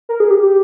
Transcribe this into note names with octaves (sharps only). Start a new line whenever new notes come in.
A#4
G#4
G4
G4